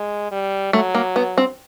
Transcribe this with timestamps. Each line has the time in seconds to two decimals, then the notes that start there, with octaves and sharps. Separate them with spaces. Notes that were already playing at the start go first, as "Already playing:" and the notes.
Already playing: G#3
0.32 G3
0.73 F#3 A3
0.95 A#3
1.16 B3
1.38 C4